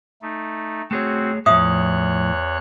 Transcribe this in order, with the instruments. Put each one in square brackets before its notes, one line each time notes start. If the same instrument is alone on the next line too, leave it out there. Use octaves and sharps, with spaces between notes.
[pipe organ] A3 D#4
[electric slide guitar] A3 G#4 C#5 [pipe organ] C4 F#4
[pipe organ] E2 C#5 F#6 [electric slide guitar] A2 F3 [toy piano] E5 D#6